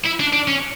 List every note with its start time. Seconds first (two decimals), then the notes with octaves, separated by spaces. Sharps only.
0.05 E4
0.20 D4
0.33 D4
0.48 C#4